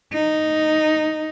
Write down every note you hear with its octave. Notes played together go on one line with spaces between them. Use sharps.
D#4